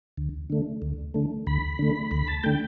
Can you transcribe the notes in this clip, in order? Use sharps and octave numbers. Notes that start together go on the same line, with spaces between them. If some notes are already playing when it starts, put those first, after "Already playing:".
D2
D3 A3
D2
D3 A3
D2 B5
D3 A3
D2 B5
A5
D3 A3 G5